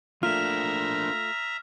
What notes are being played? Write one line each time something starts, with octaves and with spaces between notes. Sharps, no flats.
A3 A#3 D4 F4 E5 A#5 F6